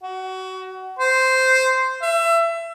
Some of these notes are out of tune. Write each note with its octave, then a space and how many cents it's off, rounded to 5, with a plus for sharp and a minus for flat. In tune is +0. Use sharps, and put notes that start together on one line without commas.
F#4 +25
C5 -5
E5 +25